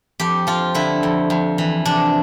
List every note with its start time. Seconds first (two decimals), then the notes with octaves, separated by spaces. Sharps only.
0.20 F2 G4
0.47 F3 F4
0.75 D3 E4
1.03 F2
1.30 F2
1.58 E3
1.85 C3 D4